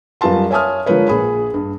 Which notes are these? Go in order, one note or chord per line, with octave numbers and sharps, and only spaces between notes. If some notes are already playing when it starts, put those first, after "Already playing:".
F#2 G3 F4 B4 A5 C6
C#5 E5 G#5 A5 D#6 F6
D3 F3 G#3 A#4 B4 C#5
A#1 G#4 B5
G2